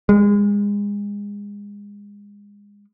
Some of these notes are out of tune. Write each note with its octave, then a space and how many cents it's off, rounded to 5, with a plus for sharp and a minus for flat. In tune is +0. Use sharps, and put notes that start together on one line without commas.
G#3 -30